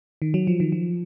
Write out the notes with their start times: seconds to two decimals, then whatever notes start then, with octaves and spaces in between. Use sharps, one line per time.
0.22 D#3
0.34 F#3
0.47 F3
0.60 D#3
0.72 F3